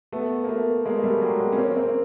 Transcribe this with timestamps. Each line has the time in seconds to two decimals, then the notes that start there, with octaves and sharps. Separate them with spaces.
0.12 A3 B3
0.44 A#3
0.49 A3 B3
0.85 G#3 A#3
1.03 G3 A3
1.21 F#3 G#3
1.40 G#3 A#3
1.52 C#4
1.58 A#3 C4
1.76 A#3 C4